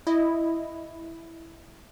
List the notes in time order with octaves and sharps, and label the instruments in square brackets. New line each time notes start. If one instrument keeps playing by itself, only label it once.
[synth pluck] E4 D#5